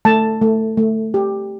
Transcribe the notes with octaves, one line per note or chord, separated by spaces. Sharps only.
A3 A5
A3
A3
G4